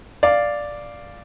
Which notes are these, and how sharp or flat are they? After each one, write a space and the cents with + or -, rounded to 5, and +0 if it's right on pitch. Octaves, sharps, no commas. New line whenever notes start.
D5 +0 F5 +0